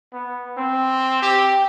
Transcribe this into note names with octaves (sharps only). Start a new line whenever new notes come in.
B3
C4
G4